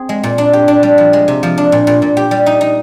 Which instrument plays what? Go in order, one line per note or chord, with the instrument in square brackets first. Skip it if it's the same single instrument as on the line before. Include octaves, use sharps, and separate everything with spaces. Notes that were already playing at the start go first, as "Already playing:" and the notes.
Already playing: [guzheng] C4 G#4
G#3
A#2
D4
G4
D4
G3
F3
G#3
C3
F3
D4
A#2
A#2
A#2
G4
G3
D#4
D#4